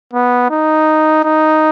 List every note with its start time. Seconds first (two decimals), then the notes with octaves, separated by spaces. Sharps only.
0.13 B3
0.50 D#4
1.24 D#4